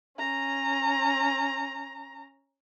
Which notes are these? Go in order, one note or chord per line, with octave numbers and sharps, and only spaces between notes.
C#4 A#5